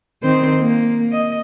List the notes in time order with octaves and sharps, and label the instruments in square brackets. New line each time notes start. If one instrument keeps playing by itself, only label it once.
[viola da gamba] D#3 C4 C5
A#3
D#5